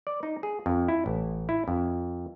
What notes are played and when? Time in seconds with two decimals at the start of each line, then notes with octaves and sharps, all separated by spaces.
0.07 D5
0.23 D#4
0.43 G#4
0.66 F2
0.88 E4
1.06 A1
1.49 E4
1.68 F2